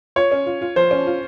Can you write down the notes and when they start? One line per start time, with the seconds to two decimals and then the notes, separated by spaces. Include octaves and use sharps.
0.16 F4 C#5
0.31 C#4
0.46 F4
0.61 F4
0.76 F3 C5
0.91 C#4
1.07 F4